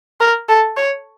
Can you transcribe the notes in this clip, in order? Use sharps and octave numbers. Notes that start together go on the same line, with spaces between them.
A#4
A4
C#5